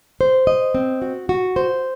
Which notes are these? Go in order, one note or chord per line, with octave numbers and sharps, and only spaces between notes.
C5
D#5
C4
F#4
F#4
C5